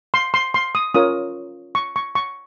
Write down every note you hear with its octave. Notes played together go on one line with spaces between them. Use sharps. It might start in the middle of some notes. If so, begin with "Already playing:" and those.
C6
C6
C6
D#6
C#4 F4 A#4 C#5 D#6
C#6
C#6
C#6